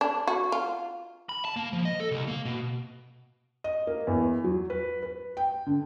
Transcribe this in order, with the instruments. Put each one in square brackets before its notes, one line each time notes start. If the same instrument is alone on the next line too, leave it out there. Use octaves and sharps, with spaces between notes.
[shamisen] D4
F#4
F4
[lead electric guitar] B5
A5
A#3
F3
D#5
A4
C2
A#3
B2
[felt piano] D#5
A#3
E2
F#3
B4
B4
G5
D3